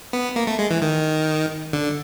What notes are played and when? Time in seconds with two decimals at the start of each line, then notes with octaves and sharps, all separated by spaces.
0.13 B3
0.36 A#3
0.47 A3
0.59 G#3
0.71 E3
0.82 D#3
1.73 D3